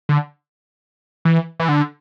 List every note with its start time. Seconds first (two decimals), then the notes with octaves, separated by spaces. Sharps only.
0.09 D3
1.25 E3
1.60 E3
1.69 D3